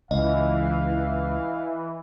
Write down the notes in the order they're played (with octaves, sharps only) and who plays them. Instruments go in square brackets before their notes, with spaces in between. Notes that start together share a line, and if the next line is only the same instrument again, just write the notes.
[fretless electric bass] C#2 [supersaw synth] E3 [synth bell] D#5 [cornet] F5